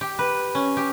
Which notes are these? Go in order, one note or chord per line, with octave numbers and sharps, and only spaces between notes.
G4
B4
C#4
G4